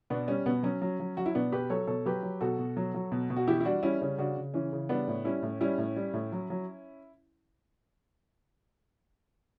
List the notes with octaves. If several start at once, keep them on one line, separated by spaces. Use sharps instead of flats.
B2 B3 D4
G3 C#4
B2 B3
F#3 C#4
F#3
F#3
F#3 F#4
E4
B2 B3 D4
B2 G4 B4
F#3 A4 C#5
B2 A4 C#5
F#3 G4 B4
F#3
B2 F#4 A4
B2
F#3
F#3
B2
B2
F#4
E3 E4 G4
E4
G3 D4 F#4
G3 C#4 E4
C#3 C#4
C#3 D4 F#4
C#3
E3 C#4
C#3
G3 B3 D4
A2
G3 C#4 E4
A2
G3 C#4 E4
A2
G3
A2
F#3
F#3